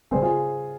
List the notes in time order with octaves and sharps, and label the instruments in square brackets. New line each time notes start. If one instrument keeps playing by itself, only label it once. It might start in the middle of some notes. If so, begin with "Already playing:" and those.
[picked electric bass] C#3 G3 C4 [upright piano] G#4 C5
[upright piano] F4 G#4